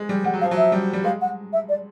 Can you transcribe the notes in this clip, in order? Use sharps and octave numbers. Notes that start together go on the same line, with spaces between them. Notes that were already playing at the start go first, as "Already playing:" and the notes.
Already playing: G#3
G3
G3 F#5
F#3
F3 F5
F#3
E5
G3
G3
G#3 F5
F#5
E5
D5